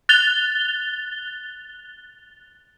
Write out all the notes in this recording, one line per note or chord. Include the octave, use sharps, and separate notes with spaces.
F#6 A6 F7 G7